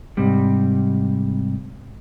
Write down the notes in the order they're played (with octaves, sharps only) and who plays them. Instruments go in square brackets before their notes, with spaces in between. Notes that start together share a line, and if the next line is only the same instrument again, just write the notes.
[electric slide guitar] G#2 C3 G3